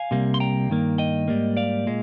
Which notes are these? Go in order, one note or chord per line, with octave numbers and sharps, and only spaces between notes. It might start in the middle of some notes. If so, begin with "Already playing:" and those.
Already playing: F5 G#5
C2 C3 G3 A#3
C6
G5 A#5
G2 D#3 A#3
D#5 G5
G#2 G3 A#3
D5 F5
A#2 G#3